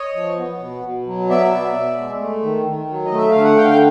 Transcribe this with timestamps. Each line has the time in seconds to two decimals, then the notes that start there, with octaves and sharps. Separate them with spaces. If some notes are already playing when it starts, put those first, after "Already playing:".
Already playing: C#5 D#5
0.15 F3
0.38 B3
0.61 B2
0.84 B2
1.07 F#3
1.29 B3 D5 E5
1.53 B2
1.75 B2
1.98 G#3
2.20 A3
2.43 D#3
2.66 D#3
2.89 F#3
3.05 D#5
3.12 A3
3.18 E5
3.30 D3 F5
3.44 F#5
3.56 D3 F5 G5
3.70 G5